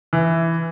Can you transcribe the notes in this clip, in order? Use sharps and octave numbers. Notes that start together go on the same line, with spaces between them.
E3